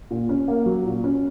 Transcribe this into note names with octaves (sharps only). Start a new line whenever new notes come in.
A#2
C#4
A#3
F#3
A#2
C#4